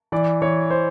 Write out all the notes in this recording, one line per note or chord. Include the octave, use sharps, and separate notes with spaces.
E3 D5
E3 C#5
C5